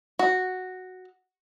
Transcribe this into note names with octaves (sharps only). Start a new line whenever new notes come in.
F#4